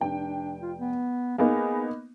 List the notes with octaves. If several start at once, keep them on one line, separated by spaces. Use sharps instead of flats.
F1 D4 G5
F4
B3
A#3 B3 D#4 G#4